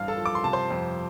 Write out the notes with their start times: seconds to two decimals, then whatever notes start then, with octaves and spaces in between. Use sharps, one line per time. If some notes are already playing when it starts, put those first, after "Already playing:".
Already playing: A1 G2 F5 F6
0.08 A4 A5
0.17 F3
0.26 D6
0.35 C6
0.44 C3 A5
0.53 C5 C6
0.70 F2